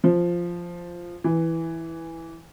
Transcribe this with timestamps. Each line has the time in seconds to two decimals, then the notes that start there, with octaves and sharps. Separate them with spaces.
0.04 F3
1.24 E3